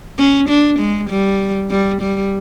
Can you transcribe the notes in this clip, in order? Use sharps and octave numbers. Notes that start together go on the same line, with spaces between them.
C#4
D4
G#3
G3
G3
G3